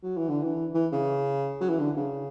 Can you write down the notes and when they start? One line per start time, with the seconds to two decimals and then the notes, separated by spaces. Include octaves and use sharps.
0.03 F#3
0.17 E3
0.29 D3
0.43 E3
0.74 E3
0.92 C#3
1.61 F#3
1.69 E3
1.79 D3
1.96 C#3